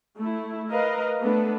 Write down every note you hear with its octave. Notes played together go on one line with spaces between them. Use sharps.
A3 E4
A#4 B4 D#5 F5
A3 B3 D4 A4 B4